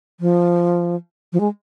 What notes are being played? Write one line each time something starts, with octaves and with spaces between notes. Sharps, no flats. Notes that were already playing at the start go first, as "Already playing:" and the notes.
F3
F3
G#3